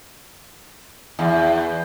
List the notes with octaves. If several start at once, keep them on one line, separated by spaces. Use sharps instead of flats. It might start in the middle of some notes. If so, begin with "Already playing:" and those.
E2